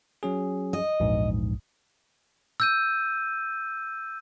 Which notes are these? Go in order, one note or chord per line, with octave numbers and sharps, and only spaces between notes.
F#3 C#4 G#4
D#5
A#1 E2 G#2
E6 G6 D#7